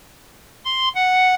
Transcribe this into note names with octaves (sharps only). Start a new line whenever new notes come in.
C6
F#5